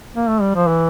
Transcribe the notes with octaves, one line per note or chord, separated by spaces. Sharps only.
A#3
A3
G3
F3
E3